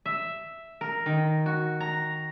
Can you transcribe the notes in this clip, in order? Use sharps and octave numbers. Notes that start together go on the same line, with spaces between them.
E5
A#4
D#3
F#4
A#5